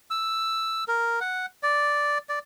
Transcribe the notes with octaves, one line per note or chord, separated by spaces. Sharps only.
E6
A#4
F#5
D5
D5